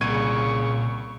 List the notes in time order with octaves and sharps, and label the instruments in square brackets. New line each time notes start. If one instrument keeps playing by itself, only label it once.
[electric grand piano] C2 G#6 D#7 [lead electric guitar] A#2 [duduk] C#3 [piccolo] C#6